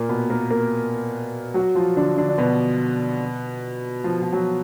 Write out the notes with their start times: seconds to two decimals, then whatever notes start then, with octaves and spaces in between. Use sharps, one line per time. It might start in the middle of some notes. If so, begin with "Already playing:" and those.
Already playing: A#2 A#3
0.09 B2 B3
0.30 A#3 A#4
0.50 A#3 A#4
1.54 F#3 F#4
1.75 F3 F4
1.96 D3 D4
2.17 D3 D4
2.29 D4
2.38 B2 B3
4.04 F3
4.22 F3
4.33 F#3